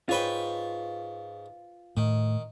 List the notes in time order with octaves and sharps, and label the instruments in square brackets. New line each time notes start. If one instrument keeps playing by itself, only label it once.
[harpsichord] G#2 C#5 G5 [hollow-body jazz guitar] F4 B4
[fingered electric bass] A2 [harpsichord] D#3